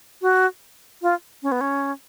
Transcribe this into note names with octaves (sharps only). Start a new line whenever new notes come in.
F#4
F4
C#4
B3
C#4